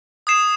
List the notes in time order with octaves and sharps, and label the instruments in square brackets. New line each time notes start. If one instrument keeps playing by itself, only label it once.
[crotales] D#6 G#6 C7 E7